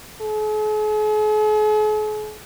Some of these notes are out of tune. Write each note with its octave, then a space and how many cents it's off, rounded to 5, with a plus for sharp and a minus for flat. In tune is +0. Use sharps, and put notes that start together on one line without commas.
G#4 +45